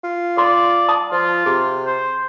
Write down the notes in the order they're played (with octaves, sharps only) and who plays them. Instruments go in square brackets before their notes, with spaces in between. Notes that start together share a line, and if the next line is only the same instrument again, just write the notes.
[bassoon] F4
[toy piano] A4 C6 [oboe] D5
[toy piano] A5 D#6
[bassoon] F3 [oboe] F4
[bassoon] C3 [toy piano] G#4
[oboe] C5